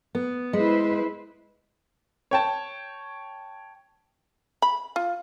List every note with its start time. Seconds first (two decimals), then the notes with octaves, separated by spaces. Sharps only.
0.15 B3
0.53 G#3 E4 B4 C5
2.31 C#5 G5 A5
4.62 B5
4.96 F4